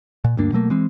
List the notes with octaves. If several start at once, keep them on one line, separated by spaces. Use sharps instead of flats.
A#2
D2 G2 A#3 D4
B2 F#3 A3 A#3
E3 G#3 C4